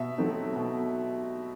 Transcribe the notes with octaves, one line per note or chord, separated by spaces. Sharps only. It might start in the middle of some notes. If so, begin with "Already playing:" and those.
Already playing: B2 E5
F#3 A3 C4 D#4
B2